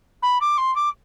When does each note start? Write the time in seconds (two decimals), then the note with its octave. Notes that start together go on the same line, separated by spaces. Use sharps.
0.22 B5
0.41 D6
0.58 C6
0.75 D6